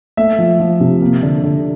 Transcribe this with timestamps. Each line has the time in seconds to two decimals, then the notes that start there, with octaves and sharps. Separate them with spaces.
0.17 A3 E5
0.38 F3
0.60 F3
0.80 C3
1.01 A#3
1.22 D3
1.43 D3